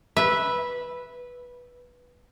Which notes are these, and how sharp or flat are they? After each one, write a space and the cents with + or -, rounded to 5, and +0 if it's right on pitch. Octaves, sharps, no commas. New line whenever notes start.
B4 -10 E5 +0